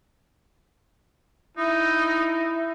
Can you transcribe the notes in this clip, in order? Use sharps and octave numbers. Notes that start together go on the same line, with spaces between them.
D#4 E4